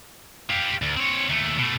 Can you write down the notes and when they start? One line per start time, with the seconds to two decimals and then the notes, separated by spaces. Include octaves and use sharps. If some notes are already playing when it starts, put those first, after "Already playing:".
0.50 G4 F5
0.82 D2
0.97 C4 C#5
1.29 D#2 A3
1.58 B2 A3